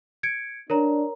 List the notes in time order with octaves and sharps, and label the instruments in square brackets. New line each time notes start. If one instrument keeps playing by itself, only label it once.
[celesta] G#6 C#7 D7
[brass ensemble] D4 [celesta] A#4 C#5 A#5